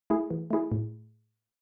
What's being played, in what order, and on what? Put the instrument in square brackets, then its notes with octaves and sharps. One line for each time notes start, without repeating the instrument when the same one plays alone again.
[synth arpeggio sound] A3 E4 G#4
E3
A3 E4 G#4
A2